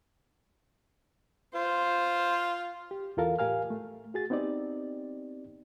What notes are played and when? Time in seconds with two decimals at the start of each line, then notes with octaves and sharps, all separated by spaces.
1.54 F4 C5
2.91 G4
3.17 E2 E3 F4 A4 A#4 F5
3.39 A2 G4 A#4 F5 G#5 F6
3.70 A3
4.14 F#4 G#4 A6
4.30 B3 C4 D#4 G4 D5